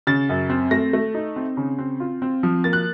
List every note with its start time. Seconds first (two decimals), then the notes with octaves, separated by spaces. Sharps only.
0.07 C#3 A6
0.29 F#2
0.50 C4
0.71 A3 A#6
0.93 A3
1.14 D#4
1.36 C4
1.57 C#3
1.78 C4
2.00 F4
2.22 C4
2.43 F3
2.64 A#3 A6
2.73 F#6